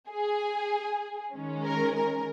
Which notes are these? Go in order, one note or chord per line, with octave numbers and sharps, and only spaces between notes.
G#4
D#3 G#3 C#4
A#4
A#4